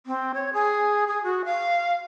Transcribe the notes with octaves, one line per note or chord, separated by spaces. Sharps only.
C4
C#5
G#4
G#4
F#4
F5